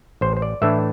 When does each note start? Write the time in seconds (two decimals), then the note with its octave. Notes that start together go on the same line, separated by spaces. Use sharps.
0.21 A1 C5
0.37 C5
0.42 D5
0.62 A2 E3 A3 D4 E5